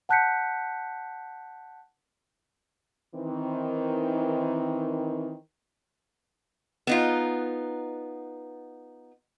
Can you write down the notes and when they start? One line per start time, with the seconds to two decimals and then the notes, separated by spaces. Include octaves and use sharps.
0.09 F#5 A5 F#6 G6 B6 C#7
3.15 D#3 E3 C4
6.87 B3 D#4 F4